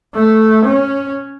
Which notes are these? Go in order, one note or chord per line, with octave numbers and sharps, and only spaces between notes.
A3
C#4